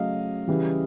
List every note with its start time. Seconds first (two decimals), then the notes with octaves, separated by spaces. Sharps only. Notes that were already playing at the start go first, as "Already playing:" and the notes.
Already playing: C#3 F#3 A3 D#5 F5
0.48 C#3 E3 G3